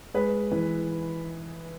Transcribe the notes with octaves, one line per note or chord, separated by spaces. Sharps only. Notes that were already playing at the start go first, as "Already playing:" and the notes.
G#3 B4
E3